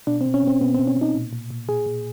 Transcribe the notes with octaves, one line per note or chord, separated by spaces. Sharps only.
B2 D4
C4
B2
C#4
B2 C4
B2 B3
C4
B2
C#4
B2 D#4
A#2
A#2
A#2
A#2 G#4
A#2